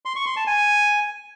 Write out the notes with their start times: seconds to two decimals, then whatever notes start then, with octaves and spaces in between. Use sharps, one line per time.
0.05 C6
0.16 C#6
0.26 C6
0.36 A5
0.47 G#5